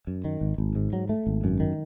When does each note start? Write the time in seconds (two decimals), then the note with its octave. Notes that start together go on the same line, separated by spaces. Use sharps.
0.07 F#2
0.24 D#3
0.41 G#1
0.58 G#1
0.75 G#2
0.93 F#3
1.09 A3
1.27 G#1
1.44 F#2
1.60 D#3